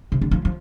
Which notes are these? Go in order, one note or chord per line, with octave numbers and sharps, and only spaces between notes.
C3
D3
F3
F3